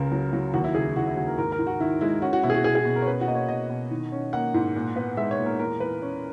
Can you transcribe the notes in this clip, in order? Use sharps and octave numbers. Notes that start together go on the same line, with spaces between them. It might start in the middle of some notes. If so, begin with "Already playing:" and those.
Already playing: C#2 C#3 A#4
F#3
F#3
D#2 F#4
E4
C#3 G#4
E4
C#3 F#4
E4
D#2 F#4
A#4
G#2 A#4
A#4
G#2
F#4
D#3 E4
G#3 E4
C#4 F#4
F#4
B2 E4
G#4
F#4
B2 G#4
G#4
B2
A#4
C#5
C#4 B4
F#4
A#3 D#5
C#5
B2 D#5
B2
D#3
C#4
A#3 F#5
G#2
A#2
B3
G#3 E5
C#5
A#2
A#4
E2 A#4
E2 B4
C#4